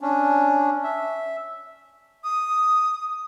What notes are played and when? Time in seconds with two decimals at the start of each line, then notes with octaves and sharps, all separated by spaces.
0.01 C#4 D4
0.84 E5
2.24 D#6